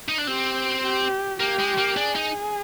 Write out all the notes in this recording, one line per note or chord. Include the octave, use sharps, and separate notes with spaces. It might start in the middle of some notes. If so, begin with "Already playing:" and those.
D#4
D4
C4 G4
G4
A#3 G4
G#3
A#3
D4 G#4
D#4